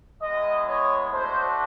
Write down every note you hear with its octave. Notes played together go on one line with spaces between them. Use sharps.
G#3 B3 E4 D#5
C#5
A3 D4 F#4 C5